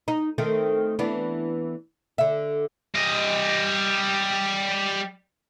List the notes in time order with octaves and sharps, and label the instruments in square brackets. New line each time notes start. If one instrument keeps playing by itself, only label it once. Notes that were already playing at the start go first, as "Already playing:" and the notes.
[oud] D#4
D#3 A3 C4
E3 B3 D4
D3 E5
[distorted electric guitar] G3 D#5